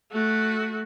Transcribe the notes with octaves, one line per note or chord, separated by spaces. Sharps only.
A3 F#4